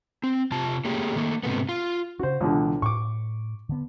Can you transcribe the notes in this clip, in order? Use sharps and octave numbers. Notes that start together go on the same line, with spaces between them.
C4
C3 F4 A5
A3 A#3 C#4 G4 G#4
D#3 A3 A#3
G#2 C3 A3 B3
F4
C#3 C#4 F#4 C5
C#2 B2 D3 E3
A2 C#6 D6
D3 B3